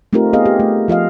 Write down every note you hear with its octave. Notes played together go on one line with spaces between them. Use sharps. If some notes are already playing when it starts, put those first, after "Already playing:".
A3 C4 D#4 F4 G4 A#4
B3 G#4 D#5 F5
G4
A3
F3 F4 D#5 F5